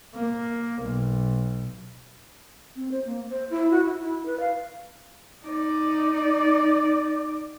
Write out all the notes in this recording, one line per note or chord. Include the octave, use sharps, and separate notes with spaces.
A#3
B1
C4
C5
A#3
C5
E4
F#4
E4
E4
B4
F5
D#4 D5